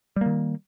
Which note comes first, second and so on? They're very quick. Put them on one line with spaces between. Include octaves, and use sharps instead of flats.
G3 A#3 D#3